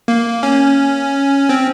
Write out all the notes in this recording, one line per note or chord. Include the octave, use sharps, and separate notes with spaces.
A#3
C#4
C4